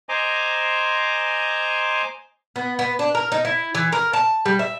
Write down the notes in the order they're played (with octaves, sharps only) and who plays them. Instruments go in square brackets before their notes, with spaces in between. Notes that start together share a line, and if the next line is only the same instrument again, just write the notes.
[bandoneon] C5 D#5 G#5 A#5 C6 D6
[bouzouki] B3
B3
D4
A#4
D#4
E4
E3
A#4
A5
G3
E5